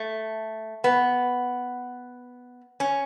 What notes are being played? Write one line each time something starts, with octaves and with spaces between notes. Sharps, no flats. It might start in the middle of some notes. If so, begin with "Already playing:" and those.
Already playing: A3
B3
C#4